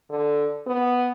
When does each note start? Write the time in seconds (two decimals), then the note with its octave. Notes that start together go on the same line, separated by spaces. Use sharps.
0.10 D3
0.67 B3